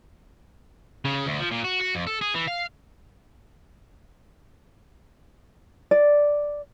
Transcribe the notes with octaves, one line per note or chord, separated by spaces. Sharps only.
C#3
D2
F3
A#2
F#4
F#4
F2
A4
G#4
E3
F5
D5